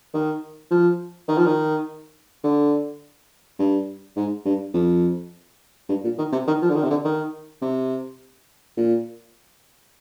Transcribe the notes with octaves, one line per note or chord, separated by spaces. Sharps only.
D#3
F3
D#3
F3
D#3
D3
G2
G#2
G2
F2
G2
A#2
D#3
C3
D#3
F3
D3
D#3
C3
D3
D#3
C3
A#2